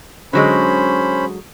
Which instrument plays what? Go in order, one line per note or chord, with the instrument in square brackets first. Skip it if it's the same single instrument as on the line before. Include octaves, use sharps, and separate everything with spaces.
[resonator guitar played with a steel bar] D3 F#3 G#3 [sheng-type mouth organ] C#4 C5 B5